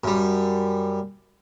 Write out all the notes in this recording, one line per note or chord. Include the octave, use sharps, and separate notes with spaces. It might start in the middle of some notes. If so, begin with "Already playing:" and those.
F#2 G3